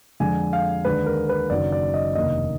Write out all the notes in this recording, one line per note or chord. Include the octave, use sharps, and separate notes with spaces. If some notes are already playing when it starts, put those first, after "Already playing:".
F2 D3 G#3 G#5
F5
D#2 D3 G#3 B4
A#4
B4
F#1 F#2 D#3 F#3 D4 D5
D5
D#5
F1 D#2 D#3 A#3 D4 D#5